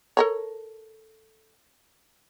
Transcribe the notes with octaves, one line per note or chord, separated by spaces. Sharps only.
A4 A#4 C#5